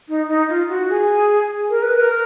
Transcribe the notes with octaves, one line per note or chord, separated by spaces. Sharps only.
D#4
D#4
F4
F#4
G#4
A#4
B4
B4
A#4